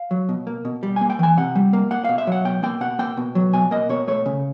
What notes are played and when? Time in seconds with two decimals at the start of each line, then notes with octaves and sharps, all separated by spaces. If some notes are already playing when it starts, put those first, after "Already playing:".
Already playing: F5
0.11 F#3
0.29 B2
0.47 A#3
0.65 B2
0.83 G3
0.96 A#3 G#5
1.10 G5
1.19 E3 G#5
1.37 C3 F#5
1.55 G3
1.73 A#3
1.91 A#3 F#5
2.05 B2 F5
2.18 E5
2.27 F#3 F#5
2.45 B2 G5
2.63 A#3 G5
2.81 B2 F#5
2.99 A#3 G5
3.17 B2
3.35 F#3
3.53 B2 G#5
3.71 A#3 D#5
3.89 B2 C#5
4.08 A3 C#5
4.26 C#3